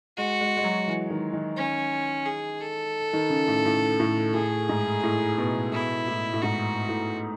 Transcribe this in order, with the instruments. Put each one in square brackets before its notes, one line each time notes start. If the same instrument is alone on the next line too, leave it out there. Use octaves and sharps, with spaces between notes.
[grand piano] G#3 [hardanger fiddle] F#4
[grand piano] G#3
G#3
F#3
E3
D#3
D#3
[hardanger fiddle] C#4
G#4
A4
[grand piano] D#3
C#3
A2
A2
A2
[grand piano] A2 [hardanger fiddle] G#4
[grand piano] G#2
A2
B2
[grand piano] B2 [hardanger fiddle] E4
[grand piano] A2
A2
[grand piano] G#2 [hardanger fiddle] F#4
[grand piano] A2